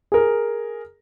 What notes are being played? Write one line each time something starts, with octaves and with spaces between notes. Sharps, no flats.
G#4 A#4